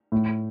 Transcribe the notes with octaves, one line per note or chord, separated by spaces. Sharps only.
A2